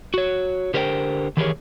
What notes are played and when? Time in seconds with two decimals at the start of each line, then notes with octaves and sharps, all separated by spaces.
0.14 F#4 C#5
0.74 D3 G4 A#4 C5 F5 G5
1.37 D#3 E3 G4 G#4 A#4 C#5